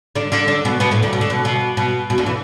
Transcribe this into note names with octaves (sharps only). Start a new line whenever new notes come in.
D3 D4
D3 D4
D3 D4
B2 B3
B2 B3
A2 A3
D2 D3
B2
D3
B2
B2
B2
B2
D2 D3
E3